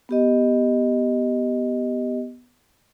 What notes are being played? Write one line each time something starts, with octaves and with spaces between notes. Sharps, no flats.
B3 G4 D#5